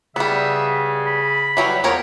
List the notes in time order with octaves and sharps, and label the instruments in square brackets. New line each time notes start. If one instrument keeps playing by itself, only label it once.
[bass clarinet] C#3 [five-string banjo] G3 B3 [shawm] E5
[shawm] B5
[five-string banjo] E3 F#3 G3
[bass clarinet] E2 [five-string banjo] F3 A#4 C#5